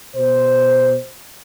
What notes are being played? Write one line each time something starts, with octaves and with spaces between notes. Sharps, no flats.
B2 C5